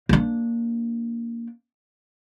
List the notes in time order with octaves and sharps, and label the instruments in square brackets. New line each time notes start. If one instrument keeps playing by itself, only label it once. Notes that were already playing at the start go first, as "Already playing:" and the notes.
[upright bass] A#3 D4